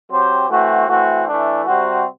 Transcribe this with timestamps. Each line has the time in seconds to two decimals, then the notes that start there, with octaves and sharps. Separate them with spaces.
0.10 F#3 C4 G4 C5
0.48 E3 A3 C4 F#4
0.88 E3 A3 C4 F#4
1.27 E3 A3 D4
1.65 C3 G3 C4 F#4